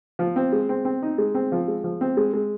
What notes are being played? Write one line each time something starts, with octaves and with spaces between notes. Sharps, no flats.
F3
C4
G#3
C4
C4
D#4
G#3
C4
F3
G#3
F3
C4
G#3
G#3